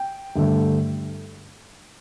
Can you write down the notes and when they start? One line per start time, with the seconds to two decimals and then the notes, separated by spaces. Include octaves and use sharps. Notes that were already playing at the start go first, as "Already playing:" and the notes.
Already playing: G5
0.36 G2 D3 A3